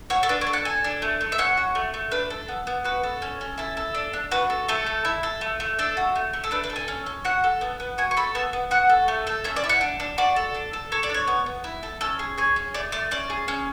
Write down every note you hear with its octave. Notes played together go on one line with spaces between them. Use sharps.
F#4 C#5
A4
D4 B4
C#5
A4
F#5
A4 G#5
D4
A3
A3
E5
C#4 F#5
F#4
A3
A3
D4 B4
A4
B3
B3
F#4 B4
A4
C#4
C#4
E4 A4
A4
D4
D4
F#4 B4
A4
A3 A4
A3
E4
A4
A3
A3
D4 A4
F#4
A3
A3
A4
D4 B4
B4
A4
G#5
C#4
C#4
F#4 F#5
A4
B3
B3
F#4 G#5
C#6
A4 B5
B3 A5
B3
F#4 F#5
A4
A3
A4
C#4 E5
D5
E4
F#5
D4
D4
F#4 D5
A4
D4
A4
A4 C#5
D5
D4 C#5
B3
B3
E4
A4
C#4 A4
G#4
G#4 C#5
C#4
A3 D5
A3 D5
C#4 D5
G#4
C#4